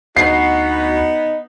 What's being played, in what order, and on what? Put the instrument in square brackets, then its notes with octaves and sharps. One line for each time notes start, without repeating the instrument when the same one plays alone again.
[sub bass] D2 [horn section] B3 D#4 [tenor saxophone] F#4 [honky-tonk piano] C7